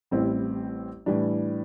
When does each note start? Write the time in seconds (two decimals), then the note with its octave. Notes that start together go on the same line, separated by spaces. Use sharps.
0.11 A1 A2 G3 C4 E4
1.06 A2 E3 G3 D4